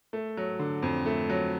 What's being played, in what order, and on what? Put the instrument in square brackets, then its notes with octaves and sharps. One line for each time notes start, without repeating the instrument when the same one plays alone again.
[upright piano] A3
F#3
D3
F2
A3
F#3